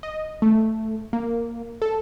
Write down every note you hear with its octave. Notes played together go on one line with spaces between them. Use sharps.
D#5
A3
A#3
A4